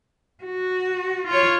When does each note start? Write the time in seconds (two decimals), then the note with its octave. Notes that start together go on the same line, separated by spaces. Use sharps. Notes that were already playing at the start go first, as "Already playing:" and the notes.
0.44 F#4
1.27 F4 C#5